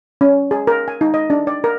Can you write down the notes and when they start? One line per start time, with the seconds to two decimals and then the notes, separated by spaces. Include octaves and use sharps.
0.21 C#4
0.51 G#4
0.67 A#4
0.88 G#5
1.01 D#4
1.14 D#5
1.30 D4
1.47 D5
1.64 A#4